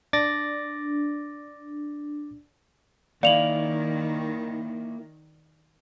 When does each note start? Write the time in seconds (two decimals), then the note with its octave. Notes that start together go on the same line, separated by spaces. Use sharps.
0.13 D4 D6 A6 A#6
3.23 D#3 A#3 E4 D5 F5 F7 F#7